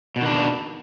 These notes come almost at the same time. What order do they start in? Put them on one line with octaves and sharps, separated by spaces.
B2 D#3 D4